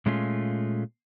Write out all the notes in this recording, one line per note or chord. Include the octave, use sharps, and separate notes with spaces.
A#2 G#3 A3 C#4 F4